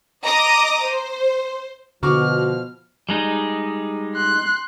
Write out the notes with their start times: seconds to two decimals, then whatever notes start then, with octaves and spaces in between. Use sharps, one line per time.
0.24 D#5 A#5 D6 D#6
0.83 C5
2.03 B2 D3 F3 F#4 C#6 D6 F6
3.09 G3 G#3 D#4
4.15 C6 F#6